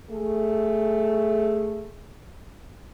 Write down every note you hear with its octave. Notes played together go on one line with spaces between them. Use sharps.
A3 G#4